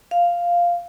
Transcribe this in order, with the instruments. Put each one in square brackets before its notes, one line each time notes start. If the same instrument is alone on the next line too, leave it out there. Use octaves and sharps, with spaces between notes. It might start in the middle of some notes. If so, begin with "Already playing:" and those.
[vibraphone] F5